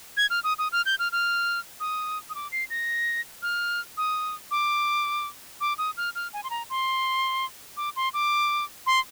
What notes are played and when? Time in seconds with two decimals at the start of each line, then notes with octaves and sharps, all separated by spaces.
0.17 G#6
0.30 F6
0.44 D#6
0.59 D#6
0.72 F6
0.86 G6
0.99 F6
1.12 F6
1.80 D#6
2.30 D#6
2.35 D6
2.52 C7
2.70 A#6
3.42 F6
3.97 D#6
4.51 D6
5.61 D6
5.78 D#6
5.97 F6
6.15 F6
6.33 G#5
6.44 C6
6.50 A#5
6.70 C6
7.77 D6
7.96 C6
8.14 D6
8.86 C6